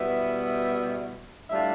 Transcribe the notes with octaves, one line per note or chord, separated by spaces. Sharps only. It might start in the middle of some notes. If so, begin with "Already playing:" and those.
Already playing: B2 G3 B3 E4 E5
A2 G3 D4 F4 E5